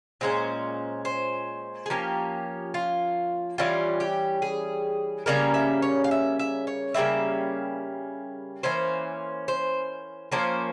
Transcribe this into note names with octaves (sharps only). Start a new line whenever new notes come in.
A#2 G#3 C#4 C5
C5
G#4
F3 A#3 C#4 G4
F4
E3 G3 C#4 F4
G4
G#4
C#3 G3 A#3 C#4 A#4
E5
C#5
F5
E5
E5
C#5
C#3 G3 A#3 C#4 E5
E3 A#3 C#4 C5
C5
F3 A#3 C#4 C5